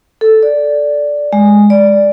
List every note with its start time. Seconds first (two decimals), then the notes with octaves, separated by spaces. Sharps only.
0.21 A4
0.43 D5
1.33 G#3
1.70 D5